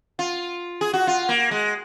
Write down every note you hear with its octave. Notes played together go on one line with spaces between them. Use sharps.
F4
G#4
F#4
F4
A#3
G#3